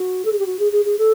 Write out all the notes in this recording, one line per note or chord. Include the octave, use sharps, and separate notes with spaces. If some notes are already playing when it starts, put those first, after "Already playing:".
Already playing: F#4
A4
G#4
G4
F#4
G#4
G#4
G#4
A4